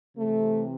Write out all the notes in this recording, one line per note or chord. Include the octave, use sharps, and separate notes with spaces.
C3 E3 A3